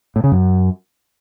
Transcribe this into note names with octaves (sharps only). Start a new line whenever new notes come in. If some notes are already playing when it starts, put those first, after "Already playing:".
A2
C#3
F#2